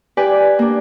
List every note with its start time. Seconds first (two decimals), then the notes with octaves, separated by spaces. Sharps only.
0.17 G4 B4 D5 G#5
0.59 A#3 D4